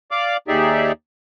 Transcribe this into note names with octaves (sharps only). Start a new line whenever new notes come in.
D5 F5 D6
D#2 D#4 G4 G#4 D5 E5